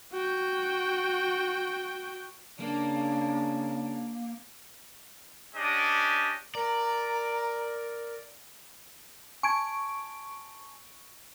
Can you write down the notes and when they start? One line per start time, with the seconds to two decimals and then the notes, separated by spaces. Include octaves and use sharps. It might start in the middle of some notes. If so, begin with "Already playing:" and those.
0.12 F#4 G5
2.60 C#3 A#3 D4
5.54 C#4 D4 G4 D#5
6.55 A#4 D5 A#5
9.43 G#5 A5 C#6 G#6 D7